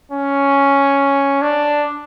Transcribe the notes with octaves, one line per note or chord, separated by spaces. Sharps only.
C#4
D4